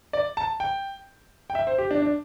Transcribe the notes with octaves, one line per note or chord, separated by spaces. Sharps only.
D5
A5
G5
G5
E5
C5
G4
D4
D4